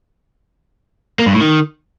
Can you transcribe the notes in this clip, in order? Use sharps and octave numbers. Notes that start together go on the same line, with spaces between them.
A#3
G2
A2
D#3